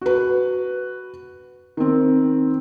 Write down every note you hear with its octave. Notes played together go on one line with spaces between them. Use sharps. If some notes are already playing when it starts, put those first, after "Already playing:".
F#4 B4
D#3 C4